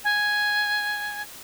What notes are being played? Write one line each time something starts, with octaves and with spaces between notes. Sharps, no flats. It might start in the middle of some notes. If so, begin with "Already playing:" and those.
G#5